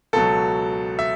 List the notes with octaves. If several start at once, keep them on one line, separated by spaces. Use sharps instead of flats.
C#2 B2 F#3 A4
E5